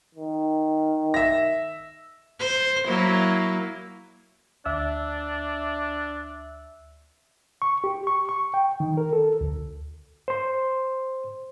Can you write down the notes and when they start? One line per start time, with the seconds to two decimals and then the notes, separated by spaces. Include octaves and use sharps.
0.15 D#3
1.14 E5 A#6
2.40 C5
2.87 F#3 A#3 E4
4.65 D2 D4 E5 E6
7.62 C#6
7.84 G4
8.07 C#6
8.29 C#6
8.54 G5
8.80 D#3
8.97 A#4
9.13 A4
9.41 D2
10.28 C5 C6